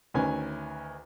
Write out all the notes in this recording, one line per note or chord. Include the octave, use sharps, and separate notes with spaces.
D2 D#3 C#4 B4 G#5